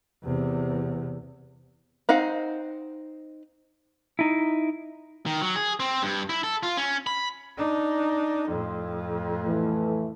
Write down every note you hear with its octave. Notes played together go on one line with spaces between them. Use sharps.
E2 C3
C4 D#4 F5 F#5
D#4 E4
D#3
F#3
G#4
C4
G2
E4
A4
F4
C#4
B5
D4 D#4
F2 A2
E3 A3